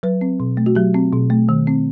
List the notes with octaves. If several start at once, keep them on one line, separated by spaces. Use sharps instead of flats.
F#3 B4
C4
B2
A3
F#4
F#3 G4
C4
B2
A3
D#3
C4